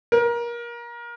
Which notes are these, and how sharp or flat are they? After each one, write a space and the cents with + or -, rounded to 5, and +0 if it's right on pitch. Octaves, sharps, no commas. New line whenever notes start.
A#4 +25